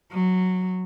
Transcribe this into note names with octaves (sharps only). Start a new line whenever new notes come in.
F#3